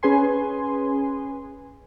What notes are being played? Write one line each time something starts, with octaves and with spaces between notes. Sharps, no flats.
C#4 G#4 B4 G#5 C6